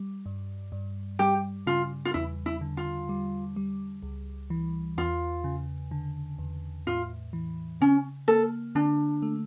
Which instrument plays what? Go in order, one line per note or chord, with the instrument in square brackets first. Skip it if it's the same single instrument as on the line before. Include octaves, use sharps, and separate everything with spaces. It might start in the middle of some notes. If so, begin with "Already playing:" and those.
Already playing: [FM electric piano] G3
G2
G2
[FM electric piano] G3 [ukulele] G4
[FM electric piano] C#3 [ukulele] F4
[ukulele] F4
[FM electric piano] E2 [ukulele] E4
[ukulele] E4
[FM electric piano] D3
[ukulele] F4
[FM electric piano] G3
G3
C#2
E3
[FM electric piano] E2 [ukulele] F4
[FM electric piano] C#3
D3
E2
[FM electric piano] A2 [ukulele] F4
[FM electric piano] E3
[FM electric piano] C#3 [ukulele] C#4
[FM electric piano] A#3 [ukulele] A4
[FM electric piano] D3 [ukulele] D4
[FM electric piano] A3